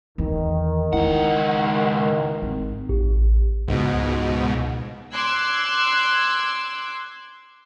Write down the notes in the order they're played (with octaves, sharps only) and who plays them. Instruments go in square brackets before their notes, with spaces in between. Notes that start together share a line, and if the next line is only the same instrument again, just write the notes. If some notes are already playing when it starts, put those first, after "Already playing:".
[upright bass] E2 [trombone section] D#3
[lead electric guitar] C#2 F#5 [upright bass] E4
[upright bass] G#1
[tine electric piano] A1
[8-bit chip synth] C#2 G#2 B2
[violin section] C6 D6 E6 F#6 G#6